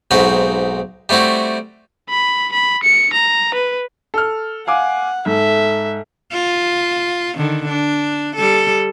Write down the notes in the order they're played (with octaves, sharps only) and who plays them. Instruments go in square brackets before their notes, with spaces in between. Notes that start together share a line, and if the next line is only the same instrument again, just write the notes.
[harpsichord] B1 G#2 C4 F#4 B4
G3 A3 C4 E4 F#4
[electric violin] B5
B5
C#7
A#5
B4
[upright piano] A4 F6
[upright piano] F5 G#5 D6 [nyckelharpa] F#5
[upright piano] G#2 [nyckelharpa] A4 E5
[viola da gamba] F4
D3 D#3
D4
G3 A4